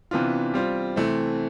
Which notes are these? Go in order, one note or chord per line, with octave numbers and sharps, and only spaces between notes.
C3 E3 B3 D4 F4
G3 C4 F4
C3 E3 A3 C4